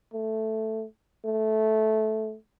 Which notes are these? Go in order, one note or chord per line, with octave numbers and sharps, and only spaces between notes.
A3
A3